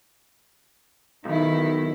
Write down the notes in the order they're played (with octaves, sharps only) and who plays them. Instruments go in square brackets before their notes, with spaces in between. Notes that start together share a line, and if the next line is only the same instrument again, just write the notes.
[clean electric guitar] B1 [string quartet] D#3 E4